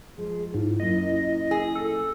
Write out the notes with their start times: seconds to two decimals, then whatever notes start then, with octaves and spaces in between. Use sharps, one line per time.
0.18 F3 G#3 G#4
0.54 G#2 E4 F4
0.80 F#2 A#2 D#5
1.51 G#4
1.75 A4